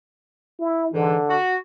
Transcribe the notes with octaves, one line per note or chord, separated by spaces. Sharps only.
E4
G#2 D3 E3
F#4